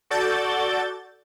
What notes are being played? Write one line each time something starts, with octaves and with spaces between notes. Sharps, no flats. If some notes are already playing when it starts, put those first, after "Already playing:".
F#4 A4 D5 G6 A6